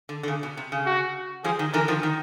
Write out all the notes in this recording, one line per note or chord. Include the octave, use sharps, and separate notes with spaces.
D3
D3
C#3
B2
C3
C#3
F#4
F3 G3 G#4
D#3
D3 E3 A#4
D#3 F3
D#3